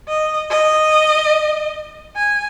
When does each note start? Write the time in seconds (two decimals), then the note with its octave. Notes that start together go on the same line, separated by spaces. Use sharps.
0.08 D#5
0.50 D#5
2.16 G#5